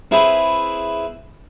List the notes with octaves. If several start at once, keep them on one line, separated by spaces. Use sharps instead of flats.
C4 E4 G#4 B4